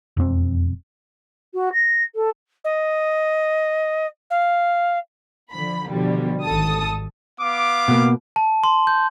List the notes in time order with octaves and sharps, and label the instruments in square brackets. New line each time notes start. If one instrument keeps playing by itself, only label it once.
[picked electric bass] E1 F2 G#3 C4
[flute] F#4
A#6
A4
[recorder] D#5
F5
[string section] D3 F3 B5
B2 D3 F3 G3
G#1 A4 A5 D#6
[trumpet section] B3 F5 D6
[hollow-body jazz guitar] B2 A#3
[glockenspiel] A5
C6
G6